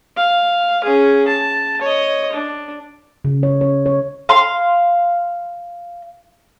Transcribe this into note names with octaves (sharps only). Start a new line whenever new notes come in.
F5
C#4 G#4
A5
C#5 D#5
D4
C#3
C#5
C#5
C#5
F5 C6